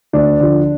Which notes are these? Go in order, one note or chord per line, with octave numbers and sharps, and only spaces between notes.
D2 D4
D3 F3